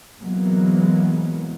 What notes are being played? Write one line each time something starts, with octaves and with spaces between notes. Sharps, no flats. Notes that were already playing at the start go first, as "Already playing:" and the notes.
C3 E3 F#3 G#3 A#3 B3